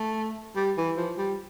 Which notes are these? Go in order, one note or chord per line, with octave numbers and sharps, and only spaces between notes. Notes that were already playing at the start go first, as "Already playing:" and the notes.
Already playing: A3
G3
E3
F3
G3